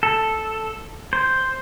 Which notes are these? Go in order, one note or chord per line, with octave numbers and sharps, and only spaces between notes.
A4
C5